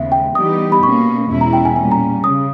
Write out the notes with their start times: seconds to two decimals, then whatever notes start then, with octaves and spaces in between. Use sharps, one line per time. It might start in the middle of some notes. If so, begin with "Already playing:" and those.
Already playing: D#2 C#3 G#3 B3 E5
0.12 G5
0.35 E3 G3 B3 D#4 G4 D#6
0.72 B5
0.83 B2 A#3 C#4 C#6
1.29 E2 B2 G#3 C#4 E4
1.41 A#5
1.53 G5
1.65 G#5
1.76 A#2 G3 C#4 G#5
1.91 A#5
2.23 C#3 D#6